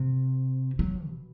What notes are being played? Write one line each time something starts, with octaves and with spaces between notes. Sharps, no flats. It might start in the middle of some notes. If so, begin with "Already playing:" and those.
Already playing: C3
F#3
B2